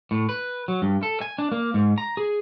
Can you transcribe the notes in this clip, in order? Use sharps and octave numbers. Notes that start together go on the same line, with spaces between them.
A2
B4
F#3
G2
A4
G#5
D4
A#3
G#2
A#5
G#4